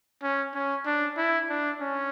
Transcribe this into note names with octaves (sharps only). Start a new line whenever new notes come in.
C#4
C#4
D4
E4
D4
C#4